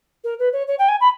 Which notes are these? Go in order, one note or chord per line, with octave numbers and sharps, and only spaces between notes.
A#4
B4
C#5
C#5
G5
G#5
B5